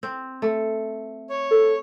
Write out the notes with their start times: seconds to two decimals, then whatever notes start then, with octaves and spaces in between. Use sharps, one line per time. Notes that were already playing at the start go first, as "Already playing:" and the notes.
0.03 C4
0.42 A3
1.29 C#5
1.51 A4